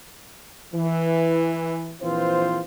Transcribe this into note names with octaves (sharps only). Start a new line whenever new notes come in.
E3
A#1 E3 C4 F4 B4 C5